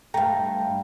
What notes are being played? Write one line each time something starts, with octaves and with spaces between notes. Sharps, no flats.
G2 A3 F5 G5 A#5